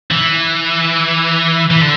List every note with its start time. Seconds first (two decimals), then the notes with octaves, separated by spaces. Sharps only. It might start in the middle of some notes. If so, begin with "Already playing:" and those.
0.11 E3
1.71 E3
1.81 D3